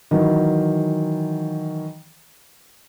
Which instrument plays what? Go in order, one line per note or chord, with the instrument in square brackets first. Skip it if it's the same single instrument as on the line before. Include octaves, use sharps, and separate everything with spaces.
[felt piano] D#3 E3 F#3